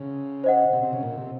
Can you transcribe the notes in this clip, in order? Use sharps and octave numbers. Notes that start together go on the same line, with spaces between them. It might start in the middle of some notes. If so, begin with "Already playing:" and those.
Already playing: C#3
C5 D#5 F#5
C3
C3
C#3
A#2
C3